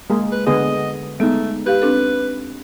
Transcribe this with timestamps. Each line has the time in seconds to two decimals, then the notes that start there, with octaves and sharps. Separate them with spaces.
0.10 G#3 A#3 G#4
0.32 B4
0.47 D3 B3 G#4 D#5
1.20 G#3 A3 B3 D#4
1.66 G4 B4 F5
1.82 C4 D4 A4